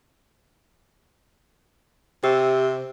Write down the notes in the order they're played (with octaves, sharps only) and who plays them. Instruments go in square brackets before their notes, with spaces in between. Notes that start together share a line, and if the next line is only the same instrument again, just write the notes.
[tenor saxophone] C3 [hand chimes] G4 E6